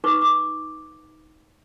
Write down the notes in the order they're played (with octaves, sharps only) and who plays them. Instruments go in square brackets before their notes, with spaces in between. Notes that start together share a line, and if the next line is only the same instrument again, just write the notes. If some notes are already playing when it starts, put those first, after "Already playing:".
[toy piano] D#4 B4 C#6 D6
D6